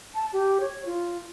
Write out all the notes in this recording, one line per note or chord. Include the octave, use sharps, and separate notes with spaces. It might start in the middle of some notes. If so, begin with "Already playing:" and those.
A5
G4
C#5
F4